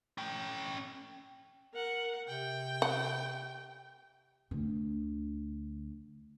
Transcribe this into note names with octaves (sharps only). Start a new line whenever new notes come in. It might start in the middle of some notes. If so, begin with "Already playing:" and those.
C#4 G5
A#4 F#5
C3 G5
F#5
D2 D3